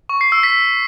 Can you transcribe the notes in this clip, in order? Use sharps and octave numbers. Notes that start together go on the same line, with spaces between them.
C#6
C7
E6
B6